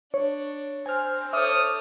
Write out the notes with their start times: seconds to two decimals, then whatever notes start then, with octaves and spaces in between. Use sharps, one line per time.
0.14 D4 C#5
0.86 C5 G#5 F6
1.33 A4 C#5 E5 D6 D#6 F6